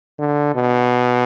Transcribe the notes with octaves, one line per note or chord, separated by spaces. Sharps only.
D3
B2